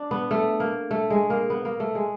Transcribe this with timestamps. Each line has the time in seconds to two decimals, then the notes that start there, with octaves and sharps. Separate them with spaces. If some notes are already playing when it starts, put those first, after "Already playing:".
Already playing: D4
0.11 B3
0.31 A3
0.60 A#3
0.91 A3
1.10 G#3
1.30 A#3
1.50 B3
1.65 A#3
1.80 A3
1.95 G#3